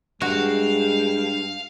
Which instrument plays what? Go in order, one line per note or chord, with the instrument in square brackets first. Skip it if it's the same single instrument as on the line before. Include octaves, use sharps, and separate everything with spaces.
[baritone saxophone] G2 [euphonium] G#3 [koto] F#4 [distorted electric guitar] F5